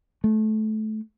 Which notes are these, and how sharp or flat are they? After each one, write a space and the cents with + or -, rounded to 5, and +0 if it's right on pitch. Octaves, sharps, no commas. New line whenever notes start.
A3 -20